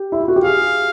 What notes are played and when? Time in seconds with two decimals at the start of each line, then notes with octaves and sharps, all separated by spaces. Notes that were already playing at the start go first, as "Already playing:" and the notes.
Already playing: G4
0.12 E4
0.20 F4
0.28 F#4
0.36 G4
0.44 G#4 F5